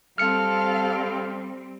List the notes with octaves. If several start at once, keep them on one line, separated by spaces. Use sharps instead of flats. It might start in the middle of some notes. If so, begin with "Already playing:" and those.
G3 C4 A4 F5 F6 C#7